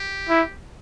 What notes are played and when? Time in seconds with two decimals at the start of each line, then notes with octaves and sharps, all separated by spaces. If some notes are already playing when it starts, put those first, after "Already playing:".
Already playing: G4
0.29 E4